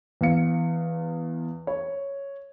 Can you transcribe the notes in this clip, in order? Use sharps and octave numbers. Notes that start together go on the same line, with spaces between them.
E2 F5 C#7
C#5